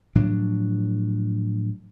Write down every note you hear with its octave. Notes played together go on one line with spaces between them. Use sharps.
A2 F3 F#3 D4